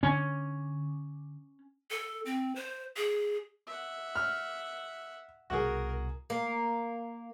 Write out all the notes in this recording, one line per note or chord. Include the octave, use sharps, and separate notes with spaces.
D3 C#4
A4
C4
C5
G#4
E5 F#5
F6
C2 B2 F#4 G#4 A#4
A#3